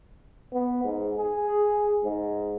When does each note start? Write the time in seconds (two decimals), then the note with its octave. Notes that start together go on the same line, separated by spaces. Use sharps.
0.53 B3
0.84 G#2
1.17 G#4
2.04 G#2